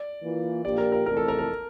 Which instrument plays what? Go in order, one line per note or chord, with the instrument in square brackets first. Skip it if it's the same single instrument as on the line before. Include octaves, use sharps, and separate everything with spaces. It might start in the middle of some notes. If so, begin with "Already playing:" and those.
Already playing: [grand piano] D5
[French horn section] E3 A#3 F4
[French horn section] A#2 F3 A#3 D4 G4 [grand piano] D5
[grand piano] A#4
A#4
[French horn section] F2 C3 E3 A3 [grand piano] A#4
[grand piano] A4
A#4
A#4